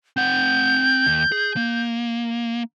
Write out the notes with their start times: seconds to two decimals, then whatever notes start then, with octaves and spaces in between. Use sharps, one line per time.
0.17 C4 F#5 G6
1.06 D#2
1.32 G#4
1.56 A#3